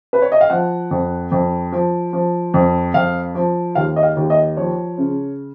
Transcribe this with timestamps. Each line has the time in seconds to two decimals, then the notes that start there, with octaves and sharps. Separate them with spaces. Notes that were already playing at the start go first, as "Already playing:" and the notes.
0.13 B4
0.22 C#5
0.32 D#5
0.41 F5
0.50 F3 F#5
0.91 F2
1.31 F2
1.72 F3
2.13 F3
2.54 F2
2.94 F2 F5
3.35 F3
3.75 D#2 F5
3.96 D#5
4.03 F5
4.16 D#2
4.30 D#5
4.57 F3 C#5
4.98 C#3